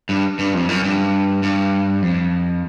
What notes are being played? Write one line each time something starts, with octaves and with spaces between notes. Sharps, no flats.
G2
G2
F2
F#2
G2
G2
F2